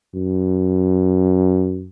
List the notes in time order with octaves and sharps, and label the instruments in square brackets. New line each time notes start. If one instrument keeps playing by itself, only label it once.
[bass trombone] F#2